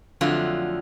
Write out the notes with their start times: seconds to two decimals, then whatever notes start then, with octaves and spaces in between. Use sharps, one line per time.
0.21 F2 D3 F#3 A3 F4